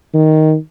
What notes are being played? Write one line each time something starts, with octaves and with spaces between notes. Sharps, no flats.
D#3